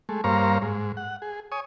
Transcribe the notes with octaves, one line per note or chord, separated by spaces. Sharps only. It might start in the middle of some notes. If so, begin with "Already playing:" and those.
G#3 A3
G2 A#3 C5 C#5 F5 A#5
G#2
F#5
G#4
C#5 G#5 D#6